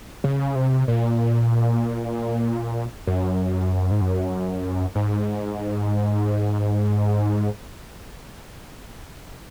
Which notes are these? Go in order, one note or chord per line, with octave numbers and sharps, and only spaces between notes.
C#3
C3
A#2
F#2
G#2
F#2
G#2